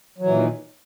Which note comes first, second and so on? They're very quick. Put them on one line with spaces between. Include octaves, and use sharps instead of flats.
F#3 E3 A#2 D#3